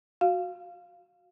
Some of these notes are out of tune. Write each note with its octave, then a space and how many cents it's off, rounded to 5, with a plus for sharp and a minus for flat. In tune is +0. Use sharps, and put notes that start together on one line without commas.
F#4 -5 F5 +0